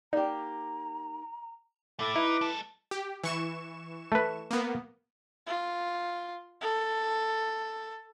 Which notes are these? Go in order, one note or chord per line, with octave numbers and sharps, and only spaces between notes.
A#3 D#4 G4 D5 A#5
A3 E4 A4 D6
D#4 E4 B4
G#3 A4
G4
E3 C#6 E7
A3 B4
A#3 B3
F4
A4